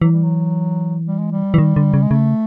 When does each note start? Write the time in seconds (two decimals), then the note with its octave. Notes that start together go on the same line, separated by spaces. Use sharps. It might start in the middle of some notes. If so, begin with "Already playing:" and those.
0.02 E3 F#3
0.12 G3
0.23 F#3
1.06 G3
1.19 G#3
1.32 G3
1.54 E3
1.58 D#3
1.76 D3
1.94 C#3
2.03 G#3
2.11 C#3 A3